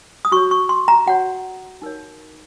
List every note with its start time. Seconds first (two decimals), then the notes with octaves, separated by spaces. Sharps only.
0.25 D#6
0.32 F#4 C#5 C#6
0.51 C#6
0.69 C6
0.88 A#5
1.06 F#4 C#5 F#5
1.82 D#4 A#4 C#5